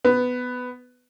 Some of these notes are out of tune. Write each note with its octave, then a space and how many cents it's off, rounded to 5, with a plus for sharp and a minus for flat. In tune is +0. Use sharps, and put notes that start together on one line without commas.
B3 +10